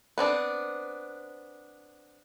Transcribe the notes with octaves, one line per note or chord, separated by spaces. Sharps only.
B3 C4 D4